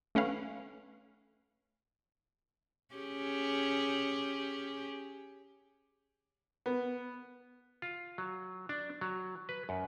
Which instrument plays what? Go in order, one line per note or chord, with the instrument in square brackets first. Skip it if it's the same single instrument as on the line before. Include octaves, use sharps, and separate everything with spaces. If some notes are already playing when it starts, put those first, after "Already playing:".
[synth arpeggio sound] A3 C#4 B4 F5
[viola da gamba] C#4 G4 G#4
[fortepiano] B3
[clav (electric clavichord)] F4
F#3
D4
F#3
B4
F#2